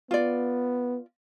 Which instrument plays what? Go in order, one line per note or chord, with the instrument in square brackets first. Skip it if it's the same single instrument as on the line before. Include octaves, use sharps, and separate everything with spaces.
[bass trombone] B3 [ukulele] F4 D5